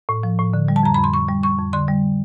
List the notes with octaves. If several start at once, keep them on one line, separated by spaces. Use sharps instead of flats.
A2
F3
A2
D3
G3
A5
F2 A#5
F2 B5
C6
D3 C#6
G3
F2 C#6
F2
D3 C6
G3